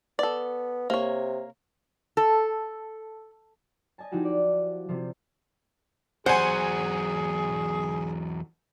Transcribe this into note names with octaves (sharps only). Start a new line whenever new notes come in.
B3 A4 D5
C3 A#3 C#5
A4
D#5 G#5 A5
F3 D#4 E4 F#4 G4
D5
C3 F3
E2 F#3 G#4 C5 F#5 G#5